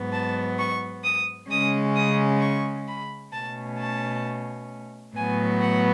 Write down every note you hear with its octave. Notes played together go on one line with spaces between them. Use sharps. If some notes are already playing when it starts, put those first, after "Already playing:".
Already playing: G#2 F#3 B3
A5
C#6
D#6
C#3 G#3 C#4 D#6
D#6
C#6
B5
B2 A3 C#4 A5
A5
A2 F#3 B3 G#5
F#5